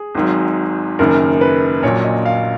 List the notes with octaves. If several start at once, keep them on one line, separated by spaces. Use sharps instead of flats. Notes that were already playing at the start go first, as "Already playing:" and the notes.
Already playing: G#4
G#1 G#2 F#3
F#1 F#2 D#3 A#4
B4
A#1 A#2 F#3 C#5
D#5
F5